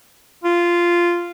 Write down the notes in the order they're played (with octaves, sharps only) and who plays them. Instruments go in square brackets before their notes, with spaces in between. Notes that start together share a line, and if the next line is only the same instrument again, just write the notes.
[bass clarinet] F4